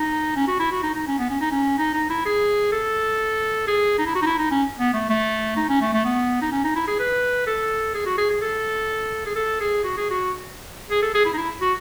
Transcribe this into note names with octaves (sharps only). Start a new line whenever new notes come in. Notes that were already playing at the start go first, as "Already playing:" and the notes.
Already playing: D#4
C#4
F#4
E4
F#4
D#4
D#4
C#4
B3
C#4
D#4
C#4
D#4
D#4
E4
G#4
A4
G#4
D#4
E4
F#4
D#4
E4
D#4
C#4
B3
A3
A3
D#4
C#4
A3
A3
B3
D#4
C#4
D#4
E4
G#4
B4
A4
G#4
F#4
G#4
G#4
A4
G#4
A4
G#4
F#4
G#4
F#4
G#4
A4
G#4
E4
D#4
E4
F#4